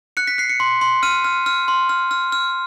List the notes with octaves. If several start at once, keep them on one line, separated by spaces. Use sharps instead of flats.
F#6 C#7
B6
F#6 C7
C#7
C6
C6
F6 D#7
F6
F6
C6
F6
F6
F6